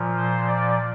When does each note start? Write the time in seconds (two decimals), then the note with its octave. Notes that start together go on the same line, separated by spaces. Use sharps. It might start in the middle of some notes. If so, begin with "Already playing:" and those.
Already playing: A#2 F3
0.17 C5
0.48 D5